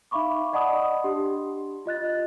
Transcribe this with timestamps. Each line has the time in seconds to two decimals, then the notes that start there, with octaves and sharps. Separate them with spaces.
0.11 D#4 E5 F5 B5 C#6 D6
0.53 D5 D#5 F#5 A5 B5 D#6
1.04 D4 G4 C6
1.86 F4 D#5 F#6 A6